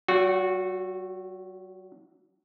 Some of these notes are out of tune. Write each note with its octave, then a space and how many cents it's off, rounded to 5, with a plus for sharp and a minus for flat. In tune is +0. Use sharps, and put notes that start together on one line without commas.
F#3 +45 F#4 -20